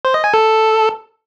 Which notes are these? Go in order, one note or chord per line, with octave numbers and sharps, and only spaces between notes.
C5
D#5
G#5
A4